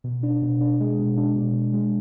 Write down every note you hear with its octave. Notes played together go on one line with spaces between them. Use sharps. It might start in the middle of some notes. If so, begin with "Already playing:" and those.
B2
D4
B2
D4
G#3
B2
D4
B2
B2
G#3